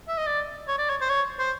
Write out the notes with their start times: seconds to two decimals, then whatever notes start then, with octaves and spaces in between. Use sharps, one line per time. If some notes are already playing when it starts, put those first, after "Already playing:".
0.08 E5
0.18 D#5
0.27 D5
0.68 C#5
0.78 D5
0.89 C#5
1.01 C5
1.09 C#5
1.39 C5